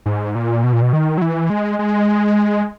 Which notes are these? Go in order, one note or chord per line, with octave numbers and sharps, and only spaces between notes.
G#2
A#2
B2
A#2
B2
D#3
F#3
E3
G#3
G#3